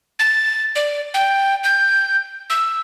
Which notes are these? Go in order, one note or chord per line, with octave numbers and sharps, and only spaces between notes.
A6
D5
G5
G6
E6